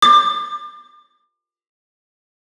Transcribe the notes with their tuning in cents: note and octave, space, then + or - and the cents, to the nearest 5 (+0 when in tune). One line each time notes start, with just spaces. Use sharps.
D6 +35